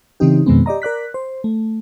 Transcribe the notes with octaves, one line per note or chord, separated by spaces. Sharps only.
C#3 E3 C4 D#4 G4
F2 B2 D#3 G#3 B3 C4
G4 D5 D#5 A#5
A#4 D5 F#6 B6
C5
A3